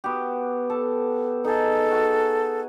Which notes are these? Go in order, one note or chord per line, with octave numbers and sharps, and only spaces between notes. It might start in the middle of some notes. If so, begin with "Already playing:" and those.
B3 F#4 G4
A4
D#4 G#4 A4
F#4 G#5